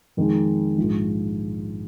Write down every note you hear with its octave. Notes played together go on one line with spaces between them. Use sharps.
F2 D#3 G#3 D#4
A#1 G#2 G#3 F4